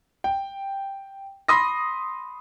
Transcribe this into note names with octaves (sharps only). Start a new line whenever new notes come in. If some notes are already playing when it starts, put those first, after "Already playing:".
G5
B5 C6 D#6 A#6